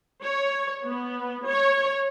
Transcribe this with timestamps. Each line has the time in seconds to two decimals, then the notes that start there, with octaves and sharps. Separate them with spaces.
0.22 C#5
0.84 B3
1.47 C#5